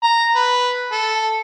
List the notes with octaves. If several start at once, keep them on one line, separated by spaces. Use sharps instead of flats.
A#5
B4
A4